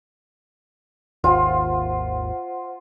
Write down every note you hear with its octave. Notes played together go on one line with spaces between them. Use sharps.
G#1 D#2 F4 C5 F#5